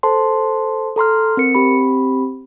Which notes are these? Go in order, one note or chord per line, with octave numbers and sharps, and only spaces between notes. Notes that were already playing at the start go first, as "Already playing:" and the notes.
A4 C5 A5 C6
A4 A#5 C6 F6
C4 A#4 C#7
C4 G4 B5